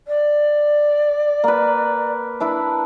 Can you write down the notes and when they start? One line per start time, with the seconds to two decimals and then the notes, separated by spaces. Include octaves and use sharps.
0.07 D5
1.44 A#3 B4
2.40 D4 E4 B4